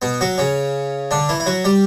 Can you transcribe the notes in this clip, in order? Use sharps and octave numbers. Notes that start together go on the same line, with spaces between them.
B2 B3
F#3 F#4
C#3 C#4
D3 D4
E3 E4
E4
F#3 F#4
G3 G4